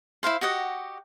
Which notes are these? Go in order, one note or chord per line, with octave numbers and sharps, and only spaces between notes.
E4 C5 F5 C6
F#4 G4 D#5 F#5